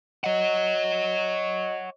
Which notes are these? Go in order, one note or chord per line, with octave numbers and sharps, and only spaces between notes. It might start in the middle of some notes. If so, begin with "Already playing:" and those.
C#5 D#5 F#5